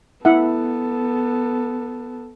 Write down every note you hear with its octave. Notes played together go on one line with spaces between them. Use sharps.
B3 E4 A4 E5 F#5